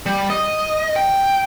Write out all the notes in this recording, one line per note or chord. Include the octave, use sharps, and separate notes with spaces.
G3
D#5
G5